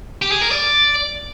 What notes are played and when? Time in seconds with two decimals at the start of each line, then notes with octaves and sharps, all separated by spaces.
0.22 G4
0.32 G#4
0.41 A#4
0.51 D5